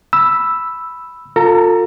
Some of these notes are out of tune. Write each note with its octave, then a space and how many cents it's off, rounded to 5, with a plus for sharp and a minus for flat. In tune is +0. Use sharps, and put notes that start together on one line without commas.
B5 +0 E6 +0
F4 +30 A4 +35 A#5 +0